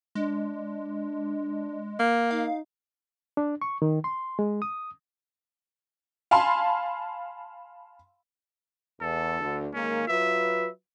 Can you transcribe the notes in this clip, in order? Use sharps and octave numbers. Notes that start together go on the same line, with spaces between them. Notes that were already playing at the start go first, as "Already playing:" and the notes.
G#3 D4
A#3
D#4 F5
D4
C#6
D#3
C6
G#3
D#6
F5 G#5 A5 B5 C6
E2 A4
D2 D3
D#3 G#3 A#3 C#4
F#3 F4 B4 E5